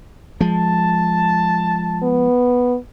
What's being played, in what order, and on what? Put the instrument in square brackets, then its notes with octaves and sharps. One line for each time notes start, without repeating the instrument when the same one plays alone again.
[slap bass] F3 G#3 [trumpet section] A5
[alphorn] B3